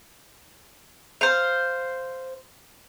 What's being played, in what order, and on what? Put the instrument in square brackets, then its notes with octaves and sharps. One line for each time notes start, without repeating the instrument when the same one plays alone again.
[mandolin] C5 F5